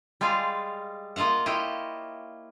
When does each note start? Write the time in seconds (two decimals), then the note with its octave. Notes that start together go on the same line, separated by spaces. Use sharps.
0.21 G3 G#3 F4 G#4 F5
1.16 A#3 F4 D#5 F5 F#5
1.46 E4 F4 G4 C#5 D#5